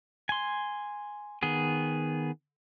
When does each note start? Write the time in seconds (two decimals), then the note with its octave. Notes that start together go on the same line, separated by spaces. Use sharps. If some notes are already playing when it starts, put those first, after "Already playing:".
0.29 G#5 C6
1.43 D#3 B3 G#4